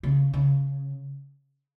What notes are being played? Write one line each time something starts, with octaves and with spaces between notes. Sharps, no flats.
C#3
C#3